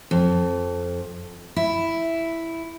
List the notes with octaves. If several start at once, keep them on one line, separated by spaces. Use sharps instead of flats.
F2
E4